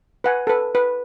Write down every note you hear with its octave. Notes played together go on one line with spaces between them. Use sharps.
B4 F#5 G#5
A4 B4
B4